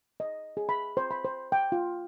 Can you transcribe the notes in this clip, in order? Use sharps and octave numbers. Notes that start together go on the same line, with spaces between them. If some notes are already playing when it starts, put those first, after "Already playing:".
D#5
G#4
B5
C5
B5
C5
G5
F4